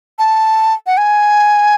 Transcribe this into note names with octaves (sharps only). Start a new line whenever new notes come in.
A5
F#5
G#5